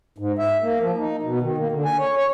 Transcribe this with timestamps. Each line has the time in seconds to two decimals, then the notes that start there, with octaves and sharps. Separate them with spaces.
0.18 G#2
0.39 E5
0.62 A#3
0.80 F3
0.98 D#4
1.23 B2
1.42 D#3
1.58 A#3
1.72 D3
1.85 G#5
1.99 C#5
2.17 C#5